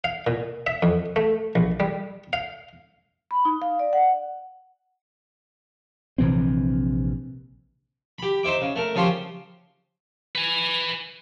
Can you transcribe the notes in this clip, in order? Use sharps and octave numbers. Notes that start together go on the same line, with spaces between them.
F5
A#2
E5
F2
A3
A#1
G3
F5
B5
D#4
F5
D5
F#5
A#1 C3 E3 C4
G4 B5
D#4 C5 E5 D6
C#3
A3 A#4
C#3 F3 C#4 G4 C6 D#6
B4 G#5